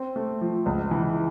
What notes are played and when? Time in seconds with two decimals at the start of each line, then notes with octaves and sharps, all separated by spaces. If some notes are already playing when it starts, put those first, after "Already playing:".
Already playing: C4
0.16 A3
0.41 F3
0.66 C#2
0.91 E3